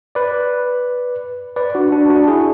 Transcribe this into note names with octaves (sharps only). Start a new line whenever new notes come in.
B4 D5
B4 D5
D4 F#4
D4
D4 F#4
E4 G#4